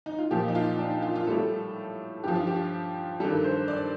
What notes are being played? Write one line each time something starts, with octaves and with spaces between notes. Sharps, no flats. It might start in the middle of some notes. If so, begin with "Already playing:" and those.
D#4
F4
A#2 F3 G4
D#4
F4
D#4
D4
D#4
F4
F4
A2 G3 A4
G2 F3 G4
F4
G4
G2 D#3 G3 A4
C5
D5